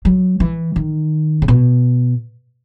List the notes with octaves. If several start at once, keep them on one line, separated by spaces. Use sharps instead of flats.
F#3
E3
D#3
C#3
B2